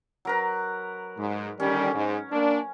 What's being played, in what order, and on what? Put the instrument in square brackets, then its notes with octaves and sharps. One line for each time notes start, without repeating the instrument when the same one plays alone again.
[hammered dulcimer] F#3 A#4 B4
[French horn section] G#2
[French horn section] D3 D#3 G3 [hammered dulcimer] C#4
[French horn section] G#2
A#3 D4